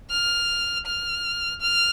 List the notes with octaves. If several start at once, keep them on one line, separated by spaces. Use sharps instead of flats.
F6
F6
F6